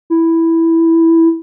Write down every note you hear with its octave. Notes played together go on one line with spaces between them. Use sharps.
E4